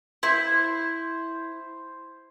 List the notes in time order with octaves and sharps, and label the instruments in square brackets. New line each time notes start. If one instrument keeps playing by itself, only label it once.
[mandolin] E4 [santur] C5